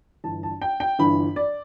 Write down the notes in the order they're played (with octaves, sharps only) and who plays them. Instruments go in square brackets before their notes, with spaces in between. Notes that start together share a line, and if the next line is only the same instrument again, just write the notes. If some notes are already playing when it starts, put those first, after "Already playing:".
[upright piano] G1 G2 E3 A5
A5
G5
G5
G1 G2 E3 B5
D5